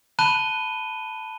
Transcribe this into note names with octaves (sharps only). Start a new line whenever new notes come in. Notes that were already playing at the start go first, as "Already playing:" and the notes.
A5 B5 F#6 D#7 G7